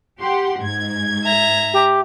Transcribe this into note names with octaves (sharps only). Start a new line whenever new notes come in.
G4 F#5 C6
G#2 G#6
E5 A#5
G4